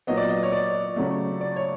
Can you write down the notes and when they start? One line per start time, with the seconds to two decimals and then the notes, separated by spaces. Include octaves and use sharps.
0.07 A#2 F#3 B3 D#5
0.17 D5
0.29 D#5
0.43 C#5
0.52 D5
0.96 C#3 F#3 A3
1.41 D5
1.56 C#5